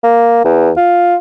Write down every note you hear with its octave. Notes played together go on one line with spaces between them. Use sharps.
A#3
E2
F4